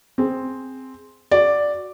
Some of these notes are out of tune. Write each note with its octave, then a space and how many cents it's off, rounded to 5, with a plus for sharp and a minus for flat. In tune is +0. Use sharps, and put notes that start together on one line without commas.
C4 +0 G#4 +0
F#4 +0 D5 +0